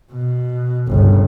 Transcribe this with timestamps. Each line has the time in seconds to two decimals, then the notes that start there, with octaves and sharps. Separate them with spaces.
0.12 B2
0.88 G1 C#2